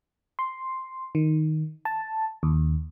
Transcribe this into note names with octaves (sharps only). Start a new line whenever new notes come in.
C6
D#3
A5
D#2